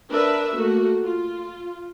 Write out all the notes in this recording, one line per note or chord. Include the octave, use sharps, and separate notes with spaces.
D4 A#4 B4 E5
A3 A#3 F#4
F4